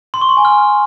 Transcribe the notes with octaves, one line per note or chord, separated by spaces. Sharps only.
C6
C#6
C6
G#5
F6